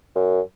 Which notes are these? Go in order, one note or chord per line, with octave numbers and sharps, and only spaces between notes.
F#2